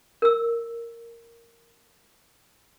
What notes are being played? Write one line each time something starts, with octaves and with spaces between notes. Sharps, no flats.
A#4 E6